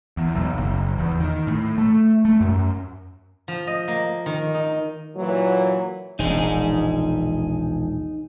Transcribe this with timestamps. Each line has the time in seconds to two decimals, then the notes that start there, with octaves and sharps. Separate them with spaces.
0.17 E2
0.35 B1
0.57 F#1
0.98 E2
1.20 D#3
1.47 A2
1.78 A3
2.25 A3
2.40 F#2
3.48 F3
3.67 D#5
3.88 A#3
4.26 D#3
4.54 D#4
5.16 A#2 E3 F#3
6.19 E1 A#1 D#4 G#4